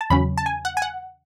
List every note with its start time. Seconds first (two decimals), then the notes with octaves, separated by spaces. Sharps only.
0.01 A5
0.10 E2 C#3 F#3 C#4 B5
0.38 A5
0.46 G#5
0.65 F#5
0.77 G#5
0.82 F#5